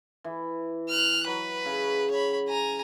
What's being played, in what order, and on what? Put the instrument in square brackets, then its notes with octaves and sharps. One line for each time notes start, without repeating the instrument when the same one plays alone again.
[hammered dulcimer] E3
[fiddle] F6 F#6
[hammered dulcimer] F#3 [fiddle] B4
[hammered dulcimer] C#3
[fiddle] C#5 B5
G#5 A#5